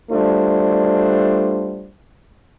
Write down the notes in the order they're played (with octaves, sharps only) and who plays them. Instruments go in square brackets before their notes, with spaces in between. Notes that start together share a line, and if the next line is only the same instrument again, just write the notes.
[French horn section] G3 A3 D4 F4 C5